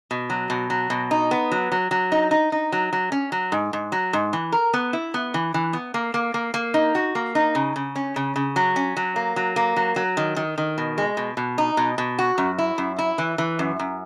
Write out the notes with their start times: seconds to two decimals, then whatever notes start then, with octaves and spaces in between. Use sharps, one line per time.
0.11 B2
0.30 F#3
0.50 B2
0.70 F#3
0.90 B2
1.11 D#4
1.31 B3
1.52 F#3
1.72 F#3
1.91 F#3
2.12 D#4
2.31 D#4
2.52 D#4
2.72 F#3
2.93 F#3
3.12 C#4
3.32 F#3
3.52 G#2
3.73 G#2
3.92 F#3
4.13 G#2
4.33 E3
4.52 A#4
4.74 B3
4.93 E4
5.14 B3
5.34 E3
5.54 E3
5.73 B3
5.94 A#3
6.14 A#3
6.34 A#3
6.54 A#3
6.74 D#4
6.95 F#4
7.15 A#3
7.35 D#4
7.55 C#3
7.76 C#3
7.96 C#4
8.16 C#3
8.36 C#3
8.56 F#3
8.76 C#4
8.97 F#3
9.16 A#3
9.36 F#3
9.56 A#3
9.76 F#3
9.96 F#3
10.17 D#3
10.37 D#3
10.58 D#3
10.78 B2
10.98 G#3
11.17 B2
11.37 B2
11.58 D#4
11.77 B2
11.98 B2
12.19 F#4
12.38 F#2
12.58 E4
12.78 F#2
12.99 E4
13.18 E3
13.38 E3
13.59 F#2
13.79 F#2